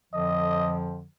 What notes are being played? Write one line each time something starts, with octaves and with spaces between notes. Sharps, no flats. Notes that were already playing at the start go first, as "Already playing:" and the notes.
F2 D3 F3 D#5